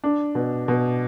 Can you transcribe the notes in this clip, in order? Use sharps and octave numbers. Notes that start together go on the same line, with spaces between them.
D4
B2
B2